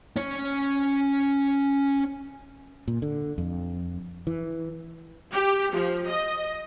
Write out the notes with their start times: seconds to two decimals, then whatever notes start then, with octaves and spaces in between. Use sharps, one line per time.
0.16 C#4 C#5
2.88 A#2
3.02 D3
3.38 F2
4.27 E3
5.33 G4
5.74 F3
6.09 D#5